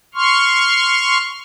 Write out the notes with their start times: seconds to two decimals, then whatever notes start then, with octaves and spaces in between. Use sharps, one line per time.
0.15 C6 C#6 F6